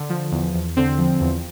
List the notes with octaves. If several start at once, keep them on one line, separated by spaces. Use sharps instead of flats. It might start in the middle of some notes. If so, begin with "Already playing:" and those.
Already playing: D3
F3
E2
E2
D3 C4
F3
E2